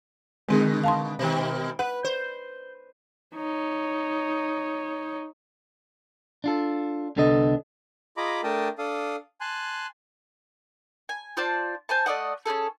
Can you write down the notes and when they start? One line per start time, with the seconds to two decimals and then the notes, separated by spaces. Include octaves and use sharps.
0.49 B2 D3 G#3 C4 G#4
0.84 F5 A5 C6
1.19 B2 D#3
1.79 B4 F#5
2.04 C5
3.35 D#4 C#5
6.44 D4 F4 A4
7.16 C2 D3 B3 D4 A4 D#5
8.17 F4 G#4 D#5 A#5 B5 D6
8.44 A3 D4 A#4 G5 A5 D#6
8.78 D4 A4 F5 D#6
9.41 G#5 A5 C6 F#6
11.09 G#5
11.37 F4 C5 D5 A5
11.89 C5 G#5 A5
12.06 A3 D5 D#5 F#5
12.46 C#4 D#4 G#4 A4